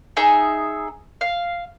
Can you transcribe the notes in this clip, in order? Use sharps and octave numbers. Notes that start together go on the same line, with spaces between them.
D#4 G#4 E5
F5